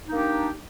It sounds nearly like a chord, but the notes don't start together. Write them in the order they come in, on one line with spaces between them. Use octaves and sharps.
D#4 D4 A#3 G4